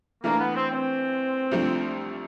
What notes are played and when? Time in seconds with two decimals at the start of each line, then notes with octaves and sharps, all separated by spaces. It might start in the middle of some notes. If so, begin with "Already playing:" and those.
0.24 E3 A3 A#3 D4
0.39 B3
0.55 C4
0.71 C4
1.51 C2 C3 F3 A3 D4